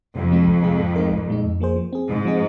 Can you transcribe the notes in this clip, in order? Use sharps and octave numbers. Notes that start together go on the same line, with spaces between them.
F2 C3
F3 G#3 C4 F4
C2
C3 G#3 C4 G#4
G#2
G#3 D#4 A#4
C2
A#2 G#3 D#4
F2
F3 A#3 G#4 C5
F3
C4 G#4
G#2 C3
F3 C4 G#4 D#5